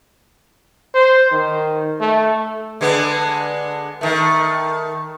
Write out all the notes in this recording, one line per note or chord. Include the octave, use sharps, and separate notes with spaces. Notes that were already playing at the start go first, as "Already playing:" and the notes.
C5
D#3
A3
D3 G#3 B3
D#3 A3